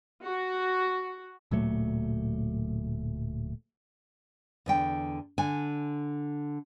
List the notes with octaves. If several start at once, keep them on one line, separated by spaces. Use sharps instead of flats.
F#4
D1 A#2 F#3 A3
E2 D3 G5
D3 G#5